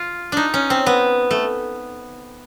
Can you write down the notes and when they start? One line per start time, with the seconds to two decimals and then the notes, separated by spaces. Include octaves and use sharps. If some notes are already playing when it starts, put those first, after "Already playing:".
Already playing: F4
0.32 D4 D#4
0.54 C#4
0.70 C4
0.86 B3
1.31 A3